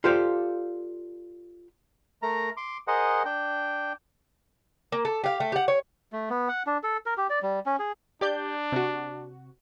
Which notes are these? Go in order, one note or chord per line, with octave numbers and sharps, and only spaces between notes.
F4 G4 A4 C5 D5 F5
A3 A#4 A#5
C6 D6
G#4 A#4 C5 D#5 F#5
D4 G5
A#3
A4
G4 F5
A3
G4 F#5
C#5
A3
B3
F#5
D4
A4
A#4
G4
D5
G3
C#4
G#4
D4 G4 D5 G6
C3 F#4